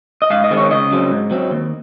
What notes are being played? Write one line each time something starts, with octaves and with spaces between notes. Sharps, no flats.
D#5
G#2 F5
D#5
D#3 G#3 C4
C#5
C#2 D#5
C#3 F#3 C4
G#2
F#3 C4
D#2